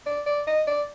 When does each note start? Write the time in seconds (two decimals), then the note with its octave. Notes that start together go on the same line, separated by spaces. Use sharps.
0.06 D5
0.26 D5
0.47 D#5
0.67 D5